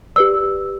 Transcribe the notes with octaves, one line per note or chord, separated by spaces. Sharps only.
G4 B4 D5 E6